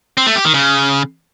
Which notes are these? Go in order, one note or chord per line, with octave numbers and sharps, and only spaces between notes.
C4
A3
G4
D#3
C#3